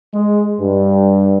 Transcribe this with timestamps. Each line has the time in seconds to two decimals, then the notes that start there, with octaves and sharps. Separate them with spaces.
0.14 G#3
0.60 G2